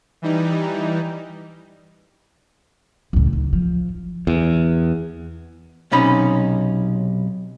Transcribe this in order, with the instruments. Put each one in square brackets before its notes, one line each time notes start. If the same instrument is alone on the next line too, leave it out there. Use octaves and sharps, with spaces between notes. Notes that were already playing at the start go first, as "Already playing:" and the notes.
[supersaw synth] E3 G3 D#4
[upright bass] C#2 A2
D#3
F3
[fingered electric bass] E2
[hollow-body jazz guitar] B1 C3 C#4 D#4 B5